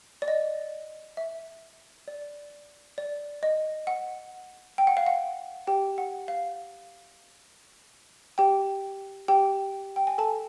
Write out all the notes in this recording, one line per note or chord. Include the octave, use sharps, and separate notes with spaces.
D5
D#5
E5
D5
D5
D#5
F#5
G5
F#5
F5
F#5
G4 G5
F#5
F5
G4 G5
G4 G5
G5
G#5
A4 A5